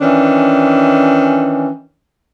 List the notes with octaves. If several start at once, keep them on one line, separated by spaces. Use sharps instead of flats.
D#3 E3 C#4 D4